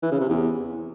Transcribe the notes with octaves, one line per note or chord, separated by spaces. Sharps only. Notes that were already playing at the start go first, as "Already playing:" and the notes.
E3
C#3
C3
E2